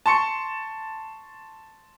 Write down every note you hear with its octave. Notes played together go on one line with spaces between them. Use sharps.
A5 C6 C#6 C#7